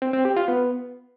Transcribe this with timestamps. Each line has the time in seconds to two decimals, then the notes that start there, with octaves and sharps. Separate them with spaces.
0.02 C4
0.13 C4
0.25 G4
0.37 F4
0.48 B3